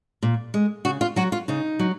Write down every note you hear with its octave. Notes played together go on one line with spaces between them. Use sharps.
A#2
G#3
C#3 F#4
F4
F#3 F#4
F4
C#3 D#4
F#3